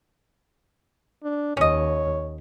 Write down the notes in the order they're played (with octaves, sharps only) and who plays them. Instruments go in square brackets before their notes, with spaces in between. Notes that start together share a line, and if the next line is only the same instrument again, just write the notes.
[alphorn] D4
[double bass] D#2 [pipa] C#4 D#5 [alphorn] C#5